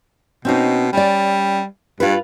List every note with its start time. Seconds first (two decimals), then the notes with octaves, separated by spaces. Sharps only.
0.45 B2 C4 C#4 D#4
0.93 G3 C#4 D5
2.00 G2 F4 B4